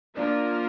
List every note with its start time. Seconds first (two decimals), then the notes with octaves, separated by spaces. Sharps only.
0.16 F3 A#3 D4 F4 A#4